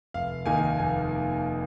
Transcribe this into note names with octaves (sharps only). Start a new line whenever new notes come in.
F1 F5
D#2 D#3 A#3 D#4 G#5
F1 G#5